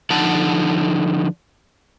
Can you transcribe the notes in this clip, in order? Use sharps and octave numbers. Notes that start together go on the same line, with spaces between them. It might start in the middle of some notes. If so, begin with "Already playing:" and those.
D3 F3 D#4 F#5 A5